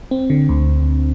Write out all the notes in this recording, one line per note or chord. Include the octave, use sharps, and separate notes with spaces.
C4
D3
D2